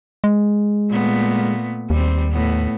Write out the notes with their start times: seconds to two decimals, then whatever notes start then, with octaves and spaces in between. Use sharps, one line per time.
0.24 G#3
0.90 A#2 A3 B3
1.90 D#2 G3 C4
2.31 A2 B3